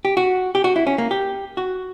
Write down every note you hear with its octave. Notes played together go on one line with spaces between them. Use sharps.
G4
F#4
G4
F#4
E4
C#4
A#3
G4
F#4